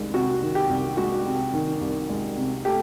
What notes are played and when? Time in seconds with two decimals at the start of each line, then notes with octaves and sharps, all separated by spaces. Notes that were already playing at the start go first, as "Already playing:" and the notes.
Already playing: C2 D#3 G#3
0.14 C3 F#4
0.42 D#3
0.55 G4
0.69 C2
0.97 G#3 F#4
1.26 C3
1.53 D#3
1.81 C2
2.10 G#3
2.38 C3
2.65 A3 G4